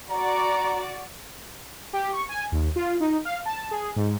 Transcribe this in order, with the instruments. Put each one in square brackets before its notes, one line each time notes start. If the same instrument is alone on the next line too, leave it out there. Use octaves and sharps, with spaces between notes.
[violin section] F#4 D5 [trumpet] A#5
[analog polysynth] G4
C#6
G#5
D#2
F4
D#4
F5
A5
G#4
G#2